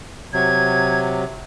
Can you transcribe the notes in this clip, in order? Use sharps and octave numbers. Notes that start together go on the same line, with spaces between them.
C3 F#3 G#6